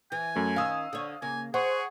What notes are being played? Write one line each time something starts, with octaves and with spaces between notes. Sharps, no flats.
E3 G#5
F#2 A3
D#3 C#4 F5 D#6 E6
D3 C#5
C#3 A#3 G#5
G#4 C5 C#5 F#5 C#6